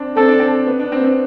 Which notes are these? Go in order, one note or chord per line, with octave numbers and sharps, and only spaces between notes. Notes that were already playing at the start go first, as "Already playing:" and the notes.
Already playing: C4 D4
C4 A4
D4
C4
B3
D4
C4
B3
C4